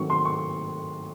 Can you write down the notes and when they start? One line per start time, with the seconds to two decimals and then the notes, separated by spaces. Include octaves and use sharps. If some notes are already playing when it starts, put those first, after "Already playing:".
Already playing: D#3 F#3 A3 C4 C#6
0.10 C6
0.25 C#6